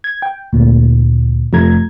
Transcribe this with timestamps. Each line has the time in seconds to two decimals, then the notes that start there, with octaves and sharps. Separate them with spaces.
0.04 G#6
0.22 G5
0.53 D2 A#2
1.53 F2 C3 F3 A3 A#5 G#6